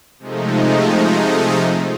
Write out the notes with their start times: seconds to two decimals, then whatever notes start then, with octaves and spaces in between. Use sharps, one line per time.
0.19 C3 F3 G#3 A3 D#4